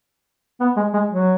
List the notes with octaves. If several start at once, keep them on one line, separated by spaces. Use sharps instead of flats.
B3
G#3
G#3
F#3